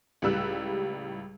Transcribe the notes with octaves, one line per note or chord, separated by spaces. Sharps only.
C#2 A2 G3 E6 F#6